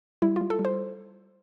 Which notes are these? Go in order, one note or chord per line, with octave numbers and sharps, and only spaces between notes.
G3 E4
G3 F4
A4
G3
C5